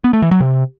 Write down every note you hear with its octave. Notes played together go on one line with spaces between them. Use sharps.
B3
A3
E3
F#3
C3